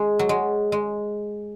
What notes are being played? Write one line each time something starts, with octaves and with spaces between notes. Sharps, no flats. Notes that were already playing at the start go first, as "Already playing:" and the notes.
Already playing: G#3
F#3
G#3
G#3